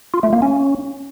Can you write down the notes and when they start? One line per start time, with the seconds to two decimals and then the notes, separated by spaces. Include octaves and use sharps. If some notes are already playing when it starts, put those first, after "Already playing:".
0.14 F4
0.23 A3
0.33 A#3
0.42 C#4